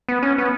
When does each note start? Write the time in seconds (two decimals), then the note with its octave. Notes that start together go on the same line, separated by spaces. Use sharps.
0.09 B3
0.23 C#4
0.38 B3